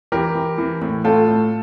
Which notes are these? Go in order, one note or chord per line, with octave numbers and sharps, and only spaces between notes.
E3 G4 A#4
E3
E3
A2
A2 F4 A4
A2